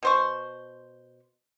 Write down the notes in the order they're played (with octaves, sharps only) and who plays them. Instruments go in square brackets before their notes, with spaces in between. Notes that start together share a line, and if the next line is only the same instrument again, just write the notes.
[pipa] B2 C5 C#6